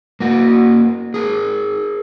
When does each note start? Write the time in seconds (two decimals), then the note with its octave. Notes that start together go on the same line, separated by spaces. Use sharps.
0.20 A#3 F#4
1.14 G#4 A#4